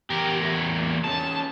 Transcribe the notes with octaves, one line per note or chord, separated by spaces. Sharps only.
E2 G4 A#4
A3 E4
A#2
G#2 C#4 A5